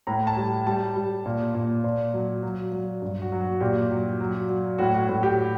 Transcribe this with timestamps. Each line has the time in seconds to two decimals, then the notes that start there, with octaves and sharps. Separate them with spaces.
0.07 A2 A#5
0.27 A5
0.37 G3
0.67 G3 A5
0.96 G3
1.26 A#2
1.55 A#2
1.84 A#2
2.13 F#3
2.43 F#3
2.72 F#3
3.02 G2
3.22 F#4
3.32 F#3
3.41 F#4
3.61 A#2 G4
3.91 F#3
4.20 F#3
4.49 F#3
4.78 A2 F#4
4.94 F#4
5.08 A2 F#4
5.23 G4